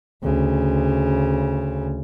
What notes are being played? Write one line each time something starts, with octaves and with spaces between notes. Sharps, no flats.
D2 C#3